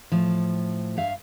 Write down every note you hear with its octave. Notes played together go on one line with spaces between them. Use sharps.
A2 F3
G2 E5 F5